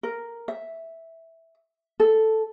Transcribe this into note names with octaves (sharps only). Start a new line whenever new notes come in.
A#4
E5
A4